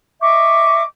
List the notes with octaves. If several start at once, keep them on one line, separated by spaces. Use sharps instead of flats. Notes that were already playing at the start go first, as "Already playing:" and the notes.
D#5 E5 C#6 D6